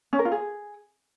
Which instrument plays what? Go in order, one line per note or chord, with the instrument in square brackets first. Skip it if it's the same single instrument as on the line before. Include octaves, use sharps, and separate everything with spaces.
[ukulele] C#4
A#4
F4
G#4